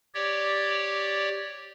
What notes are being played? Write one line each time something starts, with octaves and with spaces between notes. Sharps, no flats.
G4 C#5 D5